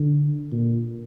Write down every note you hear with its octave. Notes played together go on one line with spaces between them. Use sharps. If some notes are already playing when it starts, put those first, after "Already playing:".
Already playing: D3
A#2